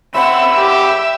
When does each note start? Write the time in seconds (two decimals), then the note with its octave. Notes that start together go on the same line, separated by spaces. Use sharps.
0.14 C#3 C4 E5 F#5 B5
0.58 G4